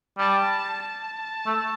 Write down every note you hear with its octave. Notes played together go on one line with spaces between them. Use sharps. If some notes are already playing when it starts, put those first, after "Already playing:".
G3 A5
A5
A3